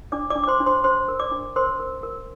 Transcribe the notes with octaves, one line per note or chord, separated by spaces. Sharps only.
D4 D5 D6
D5 D6
D4
D6
C5 C6
D4
C5 C6
D4 C5 C6
A#4
D5 D6
D4
A#4 C5 C6
A#4
A#4